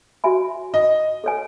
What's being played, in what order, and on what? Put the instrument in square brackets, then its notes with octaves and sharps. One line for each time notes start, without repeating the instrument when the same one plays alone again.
[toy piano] F#4 C#5 E5 G#5 B5
[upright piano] D#5
[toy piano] A4 C#5 G#5